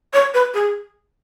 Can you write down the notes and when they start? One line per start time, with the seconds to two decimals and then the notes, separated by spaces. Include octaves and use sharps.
0.13 C#5
0.34 B4
0.54 G#4